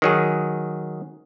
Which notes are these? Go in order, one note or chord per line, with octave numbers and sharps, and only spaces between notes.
D#3 F#3 G#4